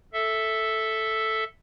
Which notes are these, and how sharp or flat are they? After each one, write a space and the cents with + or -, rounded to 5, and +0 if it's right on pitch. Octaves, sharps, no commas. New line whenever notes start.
A4 +0 E5 +0